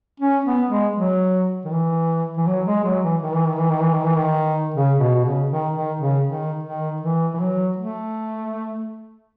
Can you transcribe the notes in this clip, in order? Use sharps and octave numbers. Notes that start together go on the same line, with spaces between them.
C#4
B3
G#3
F#3
D#3
E3
E3
F#3
G#3
F#3
E3
D#3
E3
D#3
E3
D#3
E3
D#3
E3
D#3
C#3
B2
B2
C#3
D#3
D#3
C#3
D#3
D#3
E3
E3
F#3
A3